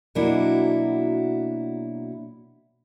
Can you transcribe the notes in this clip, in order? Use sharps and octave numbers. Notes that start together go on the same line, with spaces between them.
B2 F#3 A#3 D4 E4 F#4